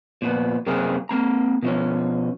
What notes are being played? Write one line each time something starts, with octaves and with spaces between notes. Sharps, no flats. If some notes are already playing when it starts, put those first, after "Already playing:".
A#2 F3 B3
F#2 C3 A#3 C4 G#4 A#4
A#3 C4 A#5
B2 F3 C#4